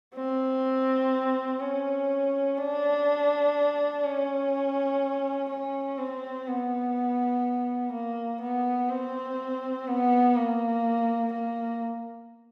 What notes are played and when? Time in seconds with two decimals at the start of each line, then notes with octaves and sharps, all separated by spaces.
0.15 C4
1.60 C#4
2.58 D4
4.04 C#4
5.49 C#4
5.99 C4
6.47 B3
7.93 A#3
8.41 B3
8.90 C4
9.88 B3
10.36 A#3
11.33 A#3